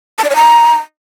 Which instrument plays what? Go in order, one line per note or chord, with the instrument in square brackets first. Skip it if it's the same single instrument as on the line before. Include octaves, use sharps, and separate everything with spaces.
[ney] A5
D5
C#5
A#5